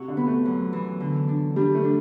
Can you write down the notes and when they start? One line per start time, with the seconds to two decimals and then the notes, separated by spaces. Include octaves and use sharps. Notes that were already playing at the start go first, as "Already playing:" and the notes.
Already playing: C3 F#4
0.08 D3
0.17 B3
0.27 A3
0.46 F#2
0.73 E3
1.00 D3
1.28 D4
1.56 G3 D4
1.75 A3
1.84 D4